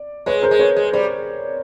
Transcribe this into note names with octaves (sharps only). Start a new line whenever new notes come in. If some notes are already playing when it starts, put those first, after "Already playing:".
Already playing: D5
G#3 B4 C#5
A#4 C5
G#3
B4 C#5
G#3
G3 C5 D5